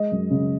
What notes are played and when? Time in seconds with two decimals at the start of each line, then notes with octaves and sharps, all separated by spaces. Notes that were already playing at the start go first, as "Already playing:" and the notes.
Already playing: G#3 D#5
0.12 F#2
0.31 C#3